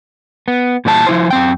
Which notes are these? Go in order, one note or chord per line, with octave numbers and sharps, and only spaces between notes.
B3
A#2 E3 G3 D4 A5
F3 E4 C5
F#2 C4 G5